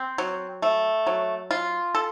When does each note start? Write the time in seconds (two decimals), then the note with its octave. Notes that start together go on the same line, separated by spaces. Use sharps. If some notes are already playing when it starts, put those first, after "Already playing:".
Already playing: C4
0.18 F#3
0.62 A3
1.07 F#3
1.51 F4
1.95 A4